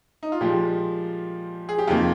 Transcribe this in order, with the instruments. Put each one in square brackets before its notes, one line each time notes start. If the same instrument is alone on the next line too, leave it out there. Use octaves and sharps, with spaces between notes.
[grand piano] D#4
F4
A#2 F3 G#3 G4
G#4
G4
F2 C3 D#3 A#3 F4